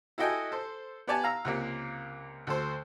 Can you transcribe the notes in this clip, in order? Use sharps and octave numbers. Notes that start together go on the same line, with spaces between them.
E4 F#4 A4 D#5 G5 G#5
A4 C5
B3 G4 D5 G#5 A5
F5 A#5 E6
C#2 C3 A#3
D2 A4 C5